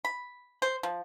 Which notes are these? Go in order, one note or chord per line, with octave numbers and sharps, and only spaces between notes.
B5
C5
F3